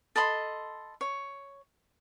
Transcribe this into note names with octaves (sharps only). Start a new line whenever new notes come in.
A4 D#5 B5 C6
C#5